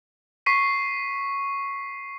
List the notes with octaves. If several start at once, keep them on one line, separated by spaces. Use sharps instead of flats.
C#6 B6 C7 D#7